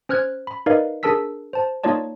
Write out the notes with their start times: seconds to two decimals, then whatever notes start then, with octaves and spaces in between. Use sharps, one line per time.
0.09 C#4 C5 F6 F#6 G#6
0.47 B5
0.66 D#4 A#4 B4 D5 D#5 F5
1.03 D4 G#4 A#4 A5 E6 B6
1.53 C5 A5
1.84 A#3 D#4 F4 C#5 D5 A5